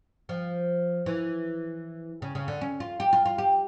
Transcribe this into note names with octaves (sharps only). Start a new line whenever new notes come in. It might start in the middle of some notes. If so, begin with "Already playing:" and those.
F3
E3
C#3
C#3
D3
C#4
F4
G4
F4
F4
G4